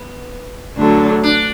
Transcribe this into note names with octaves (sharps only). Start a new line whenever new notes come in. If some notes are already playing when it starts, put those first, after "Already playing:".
Already playing: B3
D2 D3 F#3 D4
D4